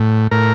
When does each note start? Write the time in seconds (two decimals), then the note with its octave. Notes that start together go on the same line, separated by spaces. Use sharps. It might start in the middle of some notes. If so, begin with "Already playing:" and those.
Already playing: A2
0.31 A2 A#4